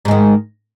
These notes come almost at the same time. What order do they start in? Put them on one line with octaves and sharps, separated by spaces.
G#2 G#3 D#3